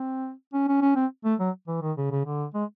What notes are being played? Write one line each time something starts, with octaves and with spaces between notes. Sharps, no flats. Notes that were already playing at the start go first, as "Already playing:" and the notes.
Already playing: C4
C#4
C#4
C#4
C4
A3
F#3
E3
D#3
C#3
C#3
D3
G#3